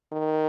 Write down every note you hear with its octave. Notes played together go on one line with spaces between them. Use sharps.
D#3